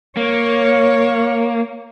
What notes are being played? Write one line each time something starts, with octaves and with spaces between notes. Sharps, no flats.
A#3 C#5